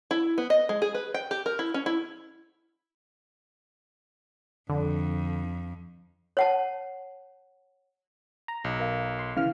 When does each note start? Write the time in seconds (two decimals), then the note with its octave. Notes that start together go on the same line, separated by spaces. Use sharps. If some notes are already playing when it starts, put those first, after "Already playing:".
0.11 E4
0.38 B3
0.50 D#5
0.69 G#3
0.82 G#4
0.94 B4
1.14 G5
1.31 G4
1.46 A#4
1.59 E4
1.74 C#4
1.86 E4
4.70 F2 D3
6.37 C#5 F#5 A5
8.48 A#5
8.64 B1
8.80 A#4 F5
9.19 C6
9.37 C#3 E3 F5 F6